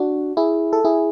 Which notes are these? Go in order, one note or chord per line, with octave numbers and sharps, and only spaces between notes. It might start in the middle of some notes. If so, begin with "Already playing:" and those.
Already playing: D4 F#4
E4 G#4
A4
E4 G#4